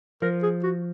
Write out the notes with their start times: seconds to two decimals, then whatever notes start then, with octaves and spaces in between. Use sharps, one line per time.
0.22 F3 A#4
0.43 G#4
0.63 F#4